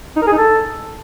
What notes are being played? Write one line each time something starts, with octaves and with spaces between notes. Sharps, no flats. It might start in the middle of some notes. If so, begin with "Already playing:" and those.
D#4
A#4
G#4
D#4
A4